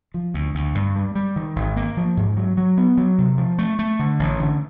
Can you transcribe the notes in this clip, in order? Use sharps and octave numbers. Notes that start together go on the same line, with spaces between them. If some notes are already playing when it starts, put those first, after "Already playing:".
F3
D2
D2
G2
G3
G3
D#3
G#1
A#3
F3
G#2
F#3
F#3
B3
F#3
C3
F3
A3
A3
D3
A1
D3